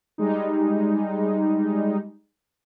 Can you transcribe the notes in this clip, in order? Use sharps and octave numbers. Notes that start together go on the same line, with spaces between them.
G3 G#3 D#4